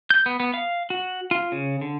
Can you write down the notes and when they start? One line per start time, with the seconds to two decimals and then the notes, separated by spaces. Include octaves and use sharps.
0.10 G6
0.26 B3
0.40 B3
0.54 F5
0.90 F#4
1.31 F4
1.52 C#3
1.81 D3